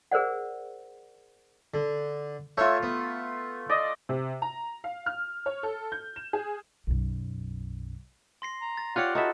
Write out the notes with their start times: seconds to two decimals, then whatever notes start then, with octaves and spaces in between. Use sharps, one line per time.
0.11 G#4 A#4 C5 D5 F#5
1.74 D3
2.57 A3 F4 C#5 E5
2.83 B3
3.69 D5 D#5
4.09 C3
4.42 A#5
4.84 F5
5.06 F6
5.46 C#5
5.63 A4
5.92 G6
6.16 E7
6.33 G#4
6.87 B1 F#2
8.42 C6 A#6 C7
8.61 A#5
8.77 A6
8.96 F4 G4 C#5 D5 F5 F#5 F#6 C#7
9.15 D#4 E4 F#4 A4 E5